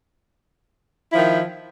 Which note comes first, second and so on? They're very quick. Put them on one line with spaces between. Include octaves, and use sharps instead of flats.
E4 F3 D#3